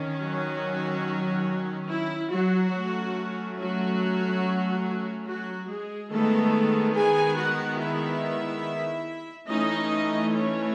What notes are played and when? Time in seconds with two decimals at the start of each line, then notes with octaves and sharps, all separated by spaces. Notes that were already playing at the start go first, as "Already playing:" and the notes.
Already playing: D#3 C#4
0.21 F#3 F#4
1.89 E4
2.31 F#3 F#4
2.74 F#3 A3 C#4
3.59 F#3 F#4
5.26 F#3 F#4
5.69 G#3 G#4
6.11 D#3 G#3 A3 B3 A4
6.95 G#4 G#5
7.36 F#4 F#5
7.79 E4 E5
9.47 E3 A3 C#4 D#4 D#5
10.32 C#4 C#5